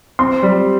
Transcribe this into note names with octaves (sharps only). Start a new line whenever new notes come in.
C4 C6
G3